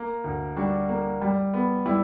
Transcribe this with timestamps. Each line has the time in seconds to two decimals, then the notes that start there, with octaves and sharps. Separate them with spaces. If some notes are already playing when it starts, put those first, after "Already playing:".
Already playing: A#3
0.24 D2
0.56 G3 D4 F#4
0.89 A#3
1.21 G3
1.54 B3
1.86 G3 E4